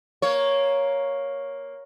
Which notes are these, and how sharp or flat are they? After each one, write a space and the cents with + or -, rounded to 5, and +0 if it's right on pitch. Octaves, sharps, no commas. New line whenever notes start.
A#3 +5 C#5 +0